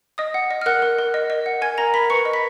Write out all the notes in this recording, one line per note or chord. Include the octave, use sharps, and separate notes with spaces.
D#5 D#6
F#5
D#5
F6
A#4 F#5 F#6
A#4
A#4
D#5
D#5
F#5
A#4 G#5 G#6
A#4 A#5 A#6
A#4 B5 B6
B4 C#6 C#7
D#5
B5 B6